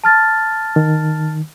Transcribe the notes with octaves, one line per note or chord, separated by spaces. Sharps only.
A5 F6 A6
D#3